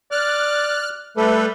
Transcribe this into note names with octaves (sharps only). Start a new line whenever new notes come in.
D5 F6 F#6
G3 A3 A4 B4